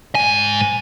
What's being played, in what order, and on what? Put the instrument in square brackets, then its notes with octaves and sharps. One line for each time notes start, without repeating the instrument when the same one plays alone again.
[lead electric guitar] G#2 G#5